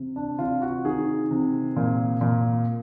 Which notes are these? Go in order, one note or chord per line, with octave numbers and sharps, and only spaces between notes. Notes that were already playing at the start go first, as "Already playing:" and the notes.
Already playing: C3
D4
C3 F4
F#4
D#3 G#4
C3
A#2
A#2